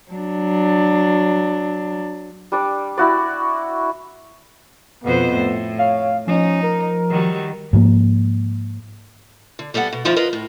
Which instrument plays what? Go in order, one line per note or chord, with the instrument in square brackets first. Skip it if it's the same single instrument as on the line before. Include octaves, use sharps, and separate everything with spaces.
[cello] F#3 D4
[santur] G3 D4 D5
E4 F#4 D5
[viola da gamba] F2 B2 C5 [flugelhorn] B3
[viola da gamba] A2
[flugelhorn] C#5 [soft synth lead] F5
[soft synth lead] F3 [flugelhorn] C#4 [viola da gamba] D#4
[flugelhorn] A#4
[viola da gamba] D#3 F#3 G3
[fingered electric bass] G#2 F3 A#3
[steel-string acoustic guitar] D3
G3 B3 A4 D5 F#5
B2
D3 D#3 F3 E4 F4
F4 A#4 B4 D#5
A2